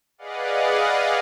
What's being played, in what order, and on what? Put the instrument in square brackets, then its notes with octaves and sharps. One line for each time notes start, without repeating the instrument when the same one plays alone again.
[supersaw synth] G#4 B4 D5 D#5 F5 F#5